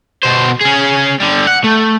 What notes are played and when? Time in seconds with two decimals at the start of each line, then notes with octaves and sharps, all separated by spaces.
0.23 B2 C5
0.61 C#4 G#4
1.20 D3 G3
1.47 F#5
1.64 A3